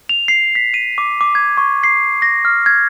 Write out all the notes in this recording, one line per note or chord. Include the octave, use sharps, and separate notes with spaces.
F7
C7
B6
D#7
D6
D6
G#6
C#6
C7
A#6
F6
G#6